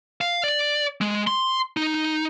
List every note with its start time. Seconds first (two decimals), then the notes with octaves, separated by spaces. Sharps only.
0.21 F5
0.44 D5
1.01 G#3
1.27 C6
1.77 D#4